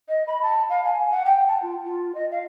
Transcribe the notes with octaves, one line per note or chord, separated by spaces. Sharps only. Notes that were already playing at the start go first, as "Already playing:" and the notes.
D#5
B5
A5
F5
G#5
F#5
G5
A5
F4
F4
D#5
F5